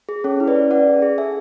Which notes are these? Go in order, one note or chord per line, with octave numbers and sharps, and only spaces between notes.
G#4
C#4 A4 C#5
E4
B4 D5
C#4
C#4 D5 F#5
G#4
G#4
A4 E5 G#5